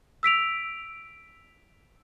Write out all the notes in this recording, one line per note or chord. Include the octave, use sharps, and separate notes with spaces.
E6 B6 D7 F7